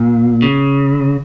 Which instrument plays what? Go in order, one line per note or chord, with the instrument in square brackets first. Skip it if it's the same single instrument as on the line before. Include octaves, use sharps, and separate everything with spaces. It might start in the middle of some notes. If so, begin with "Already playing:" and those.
Already playing: [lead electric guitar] A#2
C#3